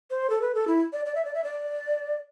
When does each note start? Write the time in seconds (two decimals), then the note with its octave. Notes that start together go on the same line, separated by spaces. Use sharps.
0.10 C5
0.30 A4
0.42 B4
0.55 A4
0.68 E4
0.93 D5
1.06 D5
1.15 E5
1.25 D5
1.34 E5
1.44 D5